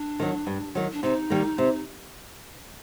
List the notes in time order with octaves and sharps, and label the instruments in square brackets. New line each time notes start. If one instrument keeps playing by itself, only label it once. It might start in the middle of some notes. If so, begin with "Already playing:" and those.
Already playing: [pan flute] D4
[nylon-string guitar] D#3 F#3
G2
D#3 F#3
[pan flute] D4
[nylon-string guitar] C3 [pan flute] D#4
[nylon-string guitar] D#3 G3 A#3
C3